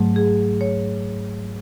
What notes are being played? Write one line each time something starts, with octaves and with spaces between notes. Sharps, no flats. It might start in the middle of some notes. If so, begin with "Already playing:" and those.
Already playing: G#2 F#3 A3
G#4
C#5